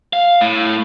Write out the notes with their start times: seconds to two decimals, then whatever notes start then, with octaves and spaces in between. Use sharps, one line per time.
0.13 F5
0.41 A2